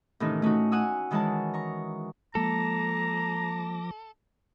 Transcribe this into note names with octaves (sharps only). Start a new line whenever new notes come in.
A2 C3 D#3 E3 C#4 D#4
A3 C#4 D#4 F#4
F#5 G#5 D#6 E6
D#3 E3 G#3 E4 C#5 A5
A#5 C#6
F3 G#3 A#3 A4 A#5 D6 A#6